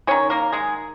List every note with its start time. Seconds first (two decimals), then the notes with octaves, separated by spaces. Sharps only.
0.07 D#3 G#3 C#4 C#5
0.30 A#3 A#4
0.52 G#3 G#4